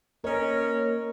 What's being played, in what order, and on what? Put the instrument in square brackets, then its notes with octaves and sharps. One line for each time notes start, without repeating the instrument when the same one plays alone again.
[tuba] A#3 [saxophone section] C#4 C#5 [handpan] A#4 D#5